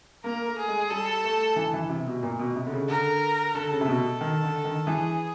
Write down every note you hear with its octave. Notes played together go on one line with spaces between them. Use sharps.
A#3 A#4
A3
G#4
G#3
G3 A4
A3
E3
E3
C3
B2
A#2
B2
C3
D3
C#3
D3 A#4
D3 A4
C#3
C3
B2
D#3
D3
D#3
E3 G#4